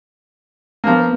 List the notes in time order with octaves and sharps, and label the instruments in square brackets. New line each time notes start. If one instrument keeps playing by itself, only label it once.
[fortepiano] F3 A#3 [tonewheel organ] B3